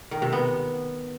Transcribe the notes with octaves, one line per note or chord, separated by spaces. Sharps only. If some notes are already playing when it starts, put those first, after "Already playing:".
D#3
C3
B3